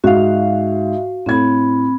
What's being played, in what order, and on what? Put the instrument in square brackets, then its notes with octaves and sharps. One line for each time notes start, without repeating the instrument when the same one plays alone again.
[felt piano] G#2 [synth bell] F#4 F5 [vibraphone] E5
[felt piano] A2 G#6 [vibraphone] C4 B5